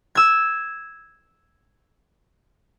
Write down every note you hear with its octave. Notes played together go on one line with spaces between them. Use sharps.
E6 G#6